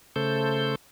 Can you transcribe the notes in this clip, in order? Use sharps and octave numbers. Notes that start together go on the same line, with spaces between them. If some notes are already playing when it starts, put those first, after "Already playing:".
C#3 A3 A4 C5 G6